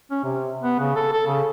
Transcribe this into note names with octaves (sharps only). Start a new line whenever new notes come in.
C#4
C3
B3
C#3
A4
A4
C#3